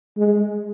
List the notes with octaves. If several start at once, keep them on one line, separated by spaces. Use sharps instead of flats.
G#3